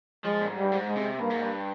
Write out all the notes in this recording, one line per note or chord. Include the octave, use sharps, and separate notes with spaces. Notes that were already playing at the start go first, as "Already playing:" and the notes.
F3 G#3
A#2
G#2
G3
G2
G#2
G#3
C3
G2 A#3
G#2
G2